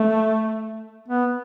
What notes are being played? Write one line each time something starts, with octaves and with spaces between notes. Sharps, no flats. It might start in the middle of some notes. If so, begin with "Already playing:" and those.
Already playing: A3
B3